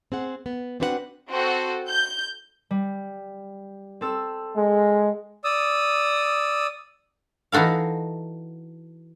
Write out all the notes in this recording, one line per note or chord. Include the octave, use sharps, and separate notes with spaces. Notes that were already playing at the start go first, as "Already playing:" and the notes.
C4 G#4 F#5
B3
C4 D4 F#4 B4 D5 F#5
C4 F#4 A4
G6
G3
C4 A4 E6
G#3
D5 D#6 E6
E3 D#4 F#4 A4 F5